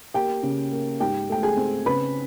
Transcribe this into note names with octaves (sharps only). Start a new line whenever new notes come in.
A#3 G4 G5
C#3
A#3
G#2 G4 G5
A3 G5
G#4 G#5
C4
C#3 B4 B5